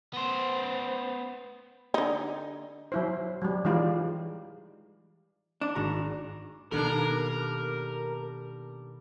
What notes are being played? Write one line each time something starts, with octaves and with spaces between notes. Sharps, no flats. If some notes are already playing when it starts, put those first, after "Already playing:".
B3 C5
D3 D#4
F#3 E4 C5
F#3 G3
E3 G3 G#3 D#4 F4 G#4
D4
G#1 F#4 A#5
B2 D#3 G3 A#3 D4 A4 A#4